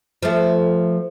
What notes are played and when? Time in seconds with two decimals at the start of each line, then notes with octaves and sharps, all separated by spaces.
0.23 F3 A3